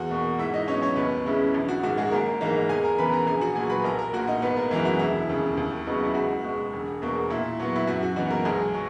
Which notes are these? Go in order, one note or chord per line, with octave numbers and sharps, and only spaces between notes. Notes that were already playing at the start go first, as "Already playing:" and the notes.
Already playing: E2 F#4 F#5
B2 A#3
G#2 E4 E5
D#4 D#5
F#3 B3 C#4 D#4 C#5
C#4 C#5
D#2 B3 B4
C#3 G#3 C#4 E4
A#1
F#4
G#2 D#3 F#4
G#3 G#4
G#1 A#3 A#4
G#2 E3 A#3 D#4
E2 G#4 G#5
A#4 A#5
C#3 E3 B3 B4 B5
A#4 A#5
A#1 G#4 G#5
F#4 F#5
A#2 F#3 G#4 G#5
B4 B5
B1 A#4 A#5
A#4 A#5
A#2 A#3 F#4 F#5
D#4 D#5
G#1 B3 B4
A#3 A#4
F#2 E3 G#3 A#3 E4 G#4
F#4
E1 E4
D#2 C#3
D#2
C#3 F#3 B3 D#4
E4
C#2 F#4
B2 G#3
E1
E2 B2 A#3
A#2 E4
F#3 B3
E4
F#2 F#4
F#4
E3 B3 D#4 F#4
A#3 A#4
B1 G#3 G#4
F#3